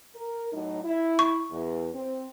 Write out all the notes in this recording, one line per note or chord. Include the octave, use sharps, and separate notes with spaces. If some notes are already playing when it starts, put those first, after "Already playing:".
A#4
A2 F#3 D#4
E4
C#6
E2
C4